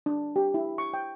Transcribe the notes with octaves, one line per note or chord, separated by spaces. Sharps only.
D4
G4
E4
C#6
G5